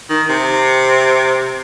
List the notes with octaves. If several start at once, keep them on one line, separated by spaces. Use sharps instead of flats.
D#3
C3